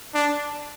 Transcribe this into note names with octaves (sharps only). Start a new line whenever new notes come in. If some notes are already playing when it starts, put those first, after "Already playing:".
D4